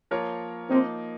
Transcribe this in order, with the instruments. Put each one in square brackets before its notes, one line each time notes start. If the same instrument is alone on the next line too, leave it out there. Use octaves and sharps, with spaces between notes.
[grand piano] F3 A#3 F4 A#4 C#5
[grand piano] F3 A#3 D#4 [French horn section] C4